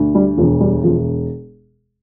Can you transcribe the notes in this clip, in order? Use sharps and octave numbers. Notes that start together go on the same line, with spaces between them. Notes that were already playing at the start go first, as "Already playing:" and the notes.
Already playing: D2
G3
E1 F3
G3
E1 F3